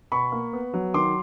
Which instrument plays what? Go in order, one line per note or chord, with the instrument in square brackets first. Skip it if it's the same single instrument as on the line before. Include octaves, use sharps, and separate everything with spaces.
[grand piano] B2 B5 C#6
A#3
B3
F#3
D#3 C6 D6